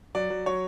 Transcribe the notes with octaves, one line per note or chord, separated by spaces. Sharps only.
F#3 D5
F#3
F#3 C#5